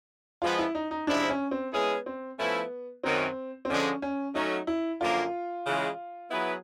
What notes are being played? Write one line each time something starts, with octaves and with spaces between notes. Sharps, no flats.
F3 G#3 B3 F4
E4
D#4
D#4
C3 F3 G#3 C4 D4 E4
C#4
C4
G#3 B3 C#4 E4 G#4
C4
F3 A3 B3 C#4 E4
F#2 D#3 F#3 C4
C4
D3 F3 G#3 C#4
C#4
F#3 A3 C#4 D#4
E4
F#2 D3 F3 A#3 D4 F4
C#3 E3 G#3
F#3 B3 E4 G#4 B4